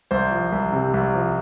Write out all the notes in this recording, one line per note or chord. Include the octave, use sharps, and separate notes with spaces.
C2 C5
F3
C2
C3
C2
F3